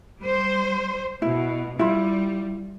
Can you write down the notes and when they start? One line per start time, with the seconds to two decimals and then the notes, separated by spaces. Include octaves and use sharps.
0.19 G3 C5
1.22 B2 E4
1.79 G3 E4 F4